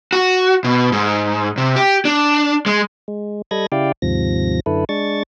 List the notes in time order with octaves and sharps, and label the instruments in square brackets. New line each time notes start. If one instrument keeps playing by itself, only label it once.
[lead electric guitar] F#4
B2
G#2
C3
G4
D4
G#3
[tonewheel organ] G#3
G3 A4 D#5 B5 G#6 A#6
C#3 E4 G4 D5 F5 G5
D#2 G#2 C3 F3 A#6
F#2 D3 E4 A4 B4
G#3 D4 C#6 A6